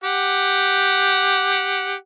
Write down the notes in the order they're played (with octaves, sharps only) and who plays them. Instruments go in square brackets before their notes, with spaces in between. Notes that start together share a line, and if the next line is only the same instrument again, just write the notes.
[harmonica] G4 F#5